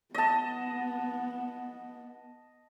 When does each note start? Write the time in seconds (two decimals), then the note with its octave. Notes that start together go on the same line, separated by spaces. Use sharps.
0.15 B3 D#5 A5